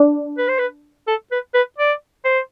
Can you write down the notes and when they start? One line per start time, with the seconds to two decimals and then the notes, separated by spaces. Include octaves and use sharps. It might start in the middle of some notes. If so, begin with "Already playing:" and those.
Already playing: D4
0.38 B4
0.48 C5
0.59 B4
1.08 A4
1.32 B4
1.54 B4
1.78 D5
2.25 C5